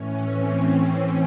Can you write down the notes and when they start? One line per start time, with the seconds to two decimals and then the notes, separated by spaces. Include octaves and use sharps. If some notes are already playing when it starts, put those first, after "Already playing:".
Already playing: A2 E3 C#4
0.31 C4